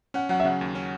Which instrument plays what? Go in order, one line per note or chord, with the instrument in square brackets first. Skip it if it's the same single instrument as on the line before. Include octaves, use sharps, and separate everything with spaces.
[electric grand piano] C#4 [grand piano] F#5
[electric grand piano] F#3 [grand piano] F#5
[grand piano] E5
[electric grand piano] C#3 [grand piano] F#5
[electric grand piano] D#2
C#4